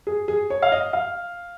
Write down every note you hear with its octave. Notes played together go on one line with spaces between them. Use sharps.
G#4
G#4
C#5
F5
D#5
F5